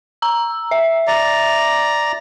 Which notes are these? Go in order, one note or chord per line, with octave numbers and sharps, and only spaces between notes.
A#5 E6
E5
D5 A#5